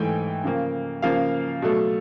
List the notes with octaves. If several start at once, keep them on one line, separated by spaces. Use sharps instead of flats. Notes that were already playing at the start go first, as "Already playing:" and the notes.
Already playing: G#2 E3 A3 G5 G#5
C#3 F3 A#3
C#3 F3 A#3 F5
B2 F#3 A3